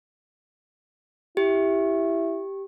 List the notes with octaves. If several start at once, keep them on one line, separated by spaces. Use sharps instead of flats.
E4 G4